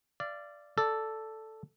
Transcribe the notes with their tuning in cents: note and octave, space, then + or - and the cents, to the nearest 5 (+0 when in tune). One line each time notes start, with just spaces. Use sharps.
D5 +0 F5 -35
A4 +0 D5 +0